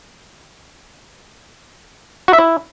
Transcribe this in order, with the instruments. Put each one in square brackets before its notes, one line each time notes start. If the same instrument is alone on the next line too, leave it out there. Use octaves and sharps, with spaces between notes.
[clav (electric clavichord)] F#4
E5
E4